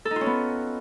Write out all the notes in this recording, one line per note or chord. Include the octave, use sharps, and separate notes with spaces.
A4
D#4
F4
C#4
B3